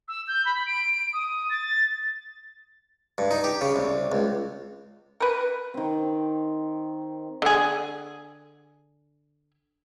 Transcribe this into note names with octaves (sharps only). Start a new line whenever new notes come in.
E6
G6
B5
D7
D#6
A6
G2
D#4
G4
C#3
C2
C#2
A#4 B4
D#3 C4
D3 G#4